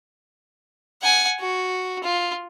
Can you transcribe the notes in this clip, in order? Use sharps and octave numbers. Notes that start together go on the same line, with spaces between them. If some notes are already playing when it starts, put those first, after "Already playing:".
F#5 G#5
F#4
F4